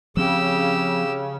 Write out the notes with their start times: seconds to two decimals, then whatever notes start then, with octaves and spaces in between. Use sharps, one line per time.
0.17 C#3 F3 C4 G4 E6